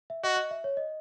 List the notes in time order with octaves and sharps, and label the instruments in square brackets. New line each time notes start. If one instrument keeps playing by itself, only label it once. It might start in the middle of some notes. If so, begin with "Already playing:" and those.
[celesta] E5
[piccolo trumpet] F#4 [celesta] D#5
[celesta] D#5
E5
C#5
D#5